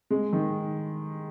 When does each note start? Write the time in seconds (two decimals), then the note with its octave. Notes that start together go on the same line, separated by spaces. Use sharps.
0.10 G#3
0.33 D#3